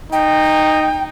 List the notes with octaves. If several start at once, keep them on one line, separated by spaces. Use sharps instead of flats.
D#4 G5